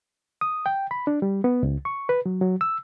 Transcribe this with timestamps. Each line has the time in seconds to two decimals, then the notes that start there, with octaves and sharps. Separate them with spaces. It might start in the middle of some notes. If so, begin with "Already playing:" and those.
0.41 D#6
0.66 G5
0.91 B5
1.07 D4
1.22 G3
1.44 B3
1.63 C#2
1.85 C#6
2.09 B4
2.26 F#3
2.41 F#3
2.61 E6